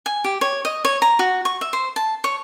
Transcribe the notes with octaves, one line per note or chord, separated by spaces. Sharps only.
G#5
G4
C#5
D#5
C#5
A#5
F#4
C#6
E5
C5
A5
C#5